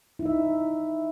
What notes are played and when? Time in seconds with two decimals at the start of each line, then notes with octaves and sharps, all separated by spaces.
0.19 E4
0.23 D#4
0.26 E5